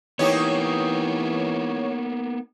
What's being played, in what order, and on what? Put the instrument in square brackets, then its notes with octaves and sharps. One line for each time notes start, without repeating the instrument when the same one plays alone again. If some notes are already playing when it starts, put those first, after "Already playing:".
[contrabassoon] E3 [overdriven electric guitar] A#3 B3 [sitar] D#4 G4 [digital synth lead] C#5